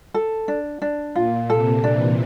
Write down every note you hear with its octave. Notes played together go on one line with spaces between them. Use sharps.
A4
D4
D4
A#2 F4
C3 A4
E3 D4